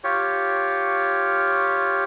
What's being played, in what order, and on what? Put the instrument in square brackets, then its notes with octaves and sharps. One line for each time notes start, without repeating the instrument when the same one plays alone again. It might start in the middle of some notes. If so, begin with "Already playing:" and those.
[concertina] F4 G4 C#5